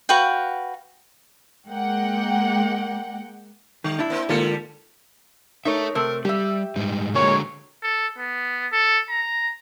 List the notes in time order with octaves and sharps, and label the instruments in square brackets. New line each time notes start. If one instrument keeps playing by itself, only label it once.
[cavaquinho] F#4 B4 F5 G5
[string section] G#3 A#3 F#5 G5
[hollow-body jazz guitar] D#3 [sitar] G3
[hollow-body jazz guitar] D4 E4
[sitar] A#3 C4
[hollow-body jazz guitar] G#2 A#3 F4 [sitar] D3 G3 A4
[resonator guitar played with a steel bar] D#4 A#4 C#5 [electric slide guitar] A4 E5
[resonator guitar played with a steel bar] C3 A3 C4 [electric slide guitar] A#4
[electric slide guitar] G3 [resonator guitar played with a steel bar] G4 E5
[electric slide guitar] G#2 G3 D#4
[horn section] A#2 G#3 C#5 [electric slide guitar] D3 F#4 A#5
[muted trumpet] A4
B3
A4
A#5